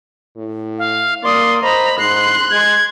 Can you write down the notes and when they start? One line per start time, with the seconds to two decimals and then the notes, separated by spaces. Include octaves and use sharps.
0.37 A2
0.79 F5
1.23 A#3 D5 C6 D#6
1.63 C5 D#5 A#5 B5
1.99 G#2 C6 F#6 C7
2.51 G#3 G#6